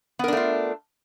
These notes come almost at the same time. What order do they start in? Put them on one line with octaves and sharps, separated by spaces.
B3 A#4 D4 A3 F4